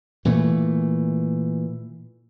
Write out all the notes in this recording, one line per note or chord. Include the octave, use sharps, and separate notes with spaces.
A#2 E3 A3